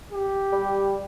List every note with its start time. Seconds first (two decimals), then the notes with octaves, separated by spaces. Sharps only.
0.12 G4
0.53 G3